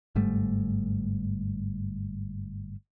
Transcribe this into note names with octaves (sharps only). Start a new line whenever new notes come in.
G1 G#2 G3 A3